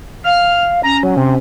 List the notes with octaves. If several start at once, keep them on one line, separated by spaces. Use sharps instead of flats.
F5 F6
C#4 A#5
F#3
C3